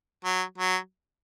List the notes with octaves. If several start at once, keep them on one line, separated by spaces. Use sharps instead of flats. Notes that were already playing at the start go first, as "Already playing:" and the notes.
F#3
F#3